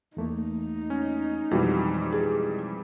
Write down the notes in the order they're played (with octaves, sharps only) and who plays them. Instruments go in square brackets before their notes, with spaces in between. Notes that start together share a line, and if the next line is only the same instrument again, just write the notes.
[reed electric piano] E2 A3 A#3 [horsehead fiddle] D#4
[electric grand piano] C#4
[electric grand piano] F2 E3 G3 [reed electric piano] B2 G#3 E4 [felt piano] F#4
[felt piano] G#4